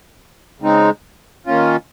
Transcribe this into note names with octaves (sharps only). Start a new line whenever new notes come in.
C#3 G#3 C4 D#4
D#3 A#3 C#4 F4